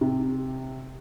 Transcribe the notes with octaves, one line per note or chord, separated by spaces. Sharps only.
C3